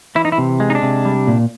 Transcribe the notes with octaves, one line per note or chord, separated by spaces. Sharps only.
E3 E4
D#4
E4
C3
G#3
D#4
D4
C3
G3
A#2